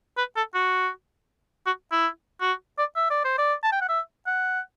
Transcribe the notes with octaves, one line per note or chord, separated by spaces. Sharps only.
B4
A4
F#4
F#4
E4
F#4
D5
E5
D5
C5
D5
A5
G5
F#5
E5
F#5